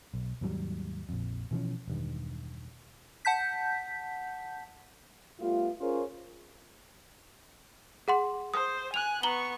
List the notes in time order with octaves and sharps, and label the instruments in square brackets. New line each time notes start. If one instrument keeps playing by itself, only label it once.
[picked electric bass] B1
D#2 G#2 F#3 G3
A#1 F2
B2 E3 F3 C#4
E1 G2 D#3
[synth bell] F#5 A5 G6 B6
[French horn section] G3 A3 B3 F4
C#4 F4 G#4 A#4 C5 C#5
[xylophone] G#4 F#5 C6
[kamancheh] C5 [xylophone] D#6
[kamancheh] G#5 F#6 [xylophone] F7
[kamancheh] B3 C#6 [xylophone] A#5 F#7 G7